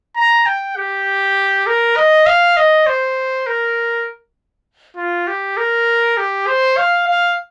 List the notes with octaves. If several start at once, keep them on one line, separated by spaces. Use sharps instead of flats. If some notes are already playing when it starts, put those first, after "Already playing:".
A#5
G5
G4
A#4
D#5
F5
D#5
C5
A#4
F4
G4
A#4
G4
C5
F5
F5